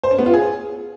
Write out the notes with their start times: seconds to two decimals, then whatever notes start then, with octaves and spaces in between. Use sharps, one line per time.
0.04 C5
0.11 C#4
0.19 B3
0.26 F4
0.34 G#4